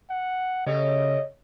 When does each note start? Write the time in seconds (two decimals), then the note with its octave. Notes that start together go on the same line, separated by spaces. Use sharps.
0.10 F#5
0.67 C#3 A3 G4 C#5 D#5